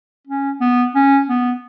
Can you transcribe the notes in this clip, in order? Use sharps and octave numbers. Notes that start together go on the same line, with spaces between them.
C#4
B3
C#4
B3